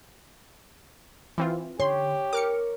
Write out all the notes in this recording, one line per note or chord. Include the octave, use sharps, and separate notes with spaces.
E3 C4 F4
D3 G4 C#5 C6
A#4 D6 F6 C#7